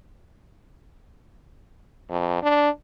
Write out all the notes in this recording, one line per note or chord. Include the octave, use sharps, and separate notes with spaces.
F2
D4